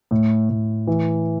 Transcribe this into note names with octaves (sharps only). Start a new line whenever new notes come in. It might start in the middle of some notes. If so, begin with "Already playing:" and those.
A2
A2
E3